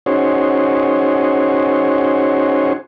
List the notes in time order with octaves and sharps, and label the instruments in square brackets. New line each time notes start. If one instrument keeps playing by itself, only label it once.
[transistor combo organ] C#4 D#4 F#4 G#4 C5 C#5